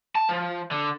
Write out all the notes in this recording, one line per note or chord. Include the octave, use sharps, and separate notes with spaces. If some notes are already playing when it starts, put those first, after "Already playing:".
A5
F3
D3